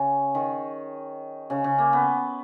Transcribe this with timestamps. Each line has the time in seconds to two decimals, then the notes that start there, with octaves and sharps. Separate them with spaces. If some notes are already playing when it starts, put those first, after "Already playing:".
Already playing: C#3
0.35 D#3
1.50 C#3
1.64 C#3
1.78 A#3
1.93 B3